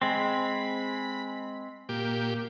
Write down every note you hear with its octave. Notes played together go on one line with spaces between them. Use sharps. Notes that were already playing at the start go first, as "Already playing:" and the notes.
G#3 C4 B5
A#2 G4